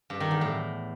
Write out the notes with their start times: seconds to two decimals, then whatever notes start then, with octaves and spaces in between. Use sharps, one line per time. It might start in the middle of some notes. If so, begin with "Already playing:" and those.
0.10 G2
0.20 D#3
0.31 E2
0.41 A2